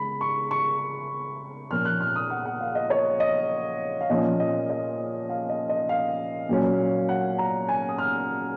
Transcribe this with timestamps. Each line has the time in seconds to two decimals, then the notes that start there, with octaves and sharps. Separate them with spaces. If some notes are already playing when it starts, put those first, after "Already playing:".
Already playing: C#3 G#3 B5
0.21 C#6
0.51 C#6
1.71 A#2 F3 A#3 C#4 F6
1.85 F#6
2.01 F6
2.16 D#6
2.30 F#5
2.45 F#5
2.61 F5
2.75 D#5
2.90 C#5
3.20 D#5
4.01 F5
4.10 A#2 F3 A#3 C#4 D#5
4.40 D#5
4.70 D#5
5.29 F5
5.49 D#5
5.69 D#5
5.89 F5
6.49 A#2 F#3 A#3 C#4
7.09 F#5
7.38 A#5
7.69 G#5
7.89 D#6
7.98 F6